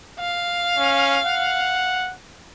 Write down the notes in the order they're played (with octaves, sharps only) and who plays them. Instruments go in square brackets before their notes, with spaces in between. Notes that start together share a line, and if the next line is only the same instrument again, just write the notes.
[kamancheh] F5
[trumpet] C#4
F#5